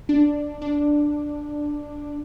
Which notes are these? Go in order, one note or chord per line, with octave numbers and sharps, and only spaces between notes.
D4
D4